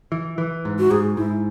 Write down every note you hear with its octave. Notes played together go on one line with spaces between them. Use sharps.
E3
E3
G#2
F#4
G#2 G#4
G#2 E4